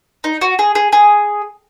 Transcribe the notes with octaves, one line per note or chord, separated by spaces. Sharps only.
D#4
F#4
G#4
G#4
G#4